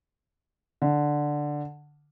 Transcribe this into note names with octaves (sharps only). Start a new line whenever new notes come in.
D3